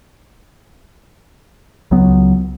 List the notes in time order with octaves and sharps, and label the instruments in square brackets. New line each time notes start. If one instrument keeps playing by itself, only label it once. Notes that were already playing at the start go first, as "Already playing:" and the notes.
[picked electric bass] C#2 F#3 B3